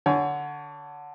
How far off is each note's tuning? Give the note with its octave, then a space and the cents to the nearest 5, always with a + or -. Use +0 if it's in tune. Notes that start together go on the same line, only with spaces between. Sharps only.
D3 +0 C#5 +30 G#5 +25